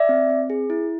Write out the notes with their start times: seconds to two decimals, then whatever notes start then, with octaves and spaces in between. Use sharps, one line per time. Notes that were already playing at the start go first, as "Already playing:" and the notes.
Already playing: D5 E5
0.09 C4
0.30 C4
0.50 G#4
0.70 E4